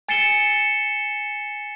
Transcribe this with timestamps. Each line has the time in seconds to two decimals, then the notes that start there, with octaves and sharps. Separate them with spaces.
0.09 G#5 A6 C7 C#7 E7 G7